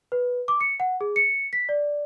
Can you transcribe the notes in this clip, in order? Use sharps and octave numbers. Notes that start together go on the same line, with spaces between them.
B4
D6
C#7
F#5
G#4
C#7
B6
D5